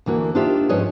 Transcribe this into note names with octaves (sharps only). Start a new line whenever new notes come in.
D2 E3 A#3 F#4
D4 D#4 F4 G4 C5 E5
G#2 F3 C#4 B4 C#5 D#5